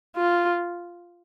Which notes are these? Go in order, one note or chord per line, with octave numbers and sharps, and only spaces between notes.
F4